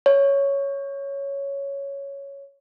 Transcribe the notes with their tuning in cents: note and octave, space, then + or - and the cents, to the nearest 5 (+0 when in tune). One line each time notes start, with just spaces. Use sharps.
C#5 +5